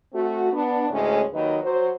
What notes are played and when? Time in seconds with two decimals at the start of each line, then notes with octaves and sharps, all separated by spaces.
0.13 A3 C4 F#4
0.53 B3 D4
0.90 D2 A2 G#3 C#4
1.32 D#2 D#3 F#3 B4 D#5
1.62 F#3 C5